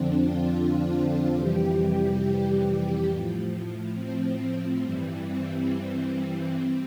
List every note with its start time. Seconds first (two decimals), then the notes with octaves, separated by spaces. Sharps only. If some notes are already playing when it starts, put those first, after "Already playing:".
Already playing: F2 D3 F3 C4 D4
0.18 F4
0.47 F4
1.34 F2 C3 E3 G3 G4
3.07 A2 F3
3.95 C4
4.82 G2 E3 G3
5.25 C4
6.55 G3 C4